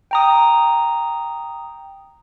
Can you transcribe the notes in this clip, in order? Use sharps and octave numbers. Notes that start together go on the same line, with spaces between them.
G5 A#5 D#6